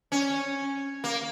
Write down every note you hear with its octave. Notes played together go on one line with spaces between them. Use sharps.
C#4
A#3